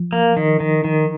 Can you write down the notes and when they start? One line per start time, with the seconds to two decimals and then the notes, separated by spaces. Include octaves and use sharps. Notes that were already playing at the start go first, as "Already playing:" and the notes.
Already playing: F3
0.13 A#3
0.37 D#3
0.60 D#3
0.84 D#3